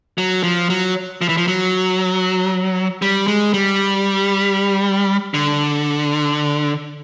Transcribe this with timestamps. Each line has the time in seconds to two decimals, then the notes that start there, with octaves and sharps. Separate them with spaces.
0.18 F#3
0.43 F3
0.70 F#3
1.22 F3
1.29 E3
1.37 F3
1.48 F#3
3.02 G3
3.27 G#3
3.54 G3
5.34 D3